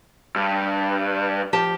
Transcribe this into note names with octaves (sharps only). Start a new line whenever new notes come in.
G2
F3 G4 A5